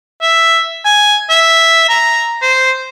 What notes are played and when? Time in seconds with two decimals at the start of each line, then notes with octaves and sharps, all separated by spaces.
0.21 E5
0.85 G#5
1.30 E5
1.89 A#5
2.42 C5